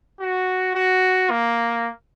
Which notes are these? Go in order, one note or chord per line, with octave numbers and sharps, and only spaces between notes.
F#4
F#4
A#3